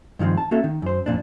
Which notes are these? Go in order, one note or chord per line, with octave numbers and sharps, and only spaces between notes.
G2 D#3 F3 G#3 C4
A5
A#3 C#4 F#4 A4 E5
D#3
F#2 C5
F2 A#2 D4